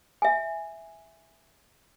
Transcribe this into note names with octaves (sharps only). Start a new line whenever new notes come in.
E5 G#5